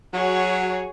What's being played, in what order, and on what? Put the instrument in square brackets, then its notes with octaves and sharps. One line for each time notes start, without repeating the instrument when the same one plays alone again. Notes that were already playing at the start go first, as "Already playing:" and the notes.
[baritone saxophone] F#3 [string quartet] F#4 G#4 C#5